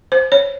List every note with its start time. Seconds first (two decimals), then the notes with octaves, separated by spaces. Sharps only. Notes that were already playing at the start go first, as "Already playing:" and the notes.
0.12 C5
0.32 C#5